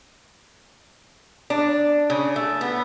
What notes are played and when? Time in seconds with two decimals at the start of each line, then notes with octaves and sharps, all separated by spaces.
1.50 D4
2.10 C#3
2.36 A3
2.61 B3